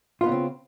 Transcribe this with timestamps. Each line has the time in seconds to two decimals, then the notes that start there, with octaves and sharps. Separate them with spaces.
0.21 F4
0.24 B3
0.26 D#4
0.29 C#3
0.31 C4